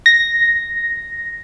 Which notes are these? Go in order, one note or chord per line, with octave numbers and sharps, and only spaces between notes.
A#6